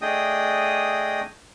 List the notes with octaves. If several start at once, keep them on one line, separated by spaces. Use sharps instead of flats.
A3 D4 G#4 D#5 G5 D#6